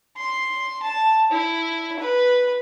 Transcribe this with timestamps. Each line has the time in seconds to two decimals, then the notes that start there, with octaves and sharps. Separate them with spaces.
0.17 C6
0.82 A5
1.31 E4
1.99 B4